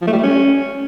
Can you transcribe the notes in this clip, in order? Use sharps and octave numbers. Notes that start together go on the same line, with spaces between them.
F3
A3
G3
A3
C#4